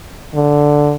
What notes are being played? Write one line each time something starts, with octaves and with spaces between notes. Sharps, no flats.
D3